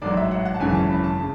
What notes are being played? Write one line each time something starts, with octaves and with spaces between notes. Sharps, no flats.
A1 G#2 F#3 D5
E5
F#5
F#5
A5
G#1 F#2 C#3 E3 G#5
A5
B5
A5
C#3